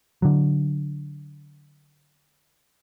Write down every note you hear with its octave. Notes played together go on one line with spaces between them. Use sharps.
D3 F#3